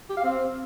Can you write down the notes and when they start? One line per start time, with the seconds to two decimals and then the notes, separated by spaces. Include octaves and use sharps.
0.10 G4
0.17 F5
0.24 C4